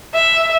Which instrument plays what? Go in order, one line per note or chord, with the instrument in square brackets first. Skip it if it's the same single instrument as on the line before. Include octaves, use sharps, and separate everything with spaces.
[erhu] E5